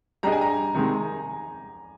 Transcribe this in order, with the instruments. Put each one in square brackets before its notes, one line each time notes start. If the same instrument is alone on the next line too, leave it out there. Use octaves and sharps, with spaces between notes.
[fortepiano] G3 D4 G#4 D#5 [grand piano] A#5
[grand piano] G#5
A#5
[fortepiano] C3 D#3 G#3